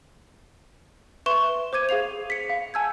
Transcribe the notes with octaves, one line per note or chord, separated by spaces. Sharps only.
B4 E5 C6 C#6 E7 G7
C5 D6 G#6 D#7
G#4 F5 C7 F7
B6 C#7
F5
G#5 A5 E6 G6 G#6